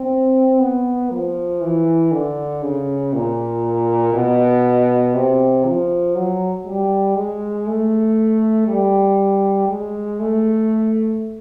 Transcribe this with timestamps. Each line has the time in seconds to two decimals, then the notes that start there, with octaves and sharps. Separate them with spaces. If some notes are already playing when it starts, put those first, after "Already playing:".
Already playing: C4
0.60 B3
1.11 F3
1.61 E3
2.12 D3
2.62 C#3
3.13 A#2
4.14 B2
5.14 C3
5.65 F3
6.15 F#3
6.66 G3
7.16 G#3
7.67 A3
8.68 G3
9.68 G#3
10.20 A3